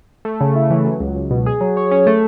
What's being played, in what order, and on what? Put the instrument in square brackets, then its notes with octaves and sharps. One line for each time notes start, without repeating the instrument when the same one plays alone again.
[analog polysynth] A3
C#3
E4
E3
F#3
C#2
C#2
B2
G#4
F#3
C#5
C#4
A3